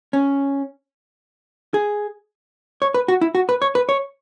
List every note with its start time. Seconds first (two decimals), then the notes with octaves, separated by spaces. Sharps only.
0.13 C#4
1.74 G#4
2.82 C#5
2.94 B4
3.08 F#4
3.21 E4
3.35 F#4
3.49 B4
3.62 C#5
3.75 B4
3.89 C#5